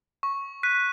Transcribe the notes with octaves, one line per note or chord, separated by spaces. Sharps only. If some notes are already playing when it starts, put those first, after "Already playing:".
C#6
F#6 B6 D#7